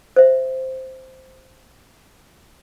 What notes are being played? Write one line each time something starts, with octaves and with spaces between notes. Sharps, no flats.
C5 E5